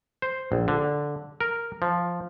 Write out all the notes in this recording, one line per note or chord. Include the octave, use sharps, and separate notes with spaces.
C5
A#1
D3
A#4
F3